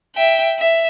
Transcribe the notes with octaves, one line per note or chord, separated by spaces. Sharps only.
E5 G5
E5